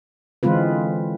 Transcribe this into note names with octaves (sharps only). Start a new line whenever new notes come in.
D3 E3 G#3 C4 F4 B4